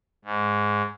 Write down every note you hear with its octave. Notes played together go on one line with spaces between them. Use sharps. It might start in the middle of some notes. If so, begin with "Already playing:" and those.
G#2